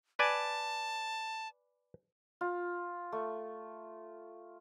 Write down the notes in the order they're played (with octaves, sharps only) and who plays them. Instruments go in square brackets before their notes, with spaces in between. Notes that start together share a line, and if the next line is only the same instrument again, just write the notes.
[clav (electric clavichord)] B4 D5 G#5 [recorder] A5
[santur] F4
A3